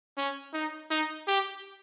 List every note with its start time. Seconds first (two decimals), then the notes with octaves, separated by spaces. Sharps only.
0.17 C#4
0.53 D#4
0.90 D#4
1.27 G4